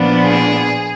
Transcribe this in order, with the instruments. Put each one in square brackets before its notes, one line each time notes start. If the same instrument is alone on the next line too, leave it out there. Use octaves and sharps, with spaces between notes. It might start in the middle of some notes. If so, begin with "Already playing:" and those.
Already playing: [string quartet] A#2 F3 B3 D4
G#4